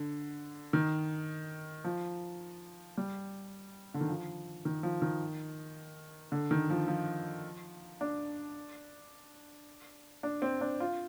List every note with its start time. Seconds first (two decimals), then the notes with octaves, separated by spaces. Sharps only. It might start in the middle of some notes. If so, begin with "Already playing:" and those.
Already playing: D3
0.73 D#3
1.84 F3
2.97 G3
3.94 D3
4.01 D#3
4.09 F3
4.65 D#3
4.83 F3
5.02 D#3
6.32 D3
6.51 D#3
6.70 F3
6.88 F3
8.01 D4
10.23 D4
10.42 C4
10.61 D4
10.80 F4